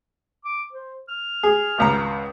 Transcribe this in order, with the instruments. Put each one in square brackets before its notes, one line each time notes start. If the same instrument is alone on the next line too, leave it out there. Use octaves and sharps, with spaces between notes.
[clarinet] D6
C5
F6
[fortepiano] G#4
G#1 C#2 A#5